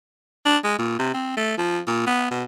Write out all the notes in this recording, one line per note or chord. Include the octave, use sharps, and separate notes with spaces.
D4
G#3
A#2
C3
C4
A3
F3
A#2
B3
B2